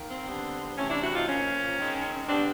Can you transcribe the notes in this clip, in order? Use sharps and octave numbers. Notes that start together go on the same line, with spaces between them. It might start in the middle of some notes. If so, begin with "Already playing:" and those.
Already playing: D#3 A#3
C4
D3 G3 B3
C3 E3 A3 C4 C#4
D4 E4
E4 F#4
D#4 F4
A#2 F3 A#3 C#4
D#3 G#3 C4
D3 G3 B3 C4 D4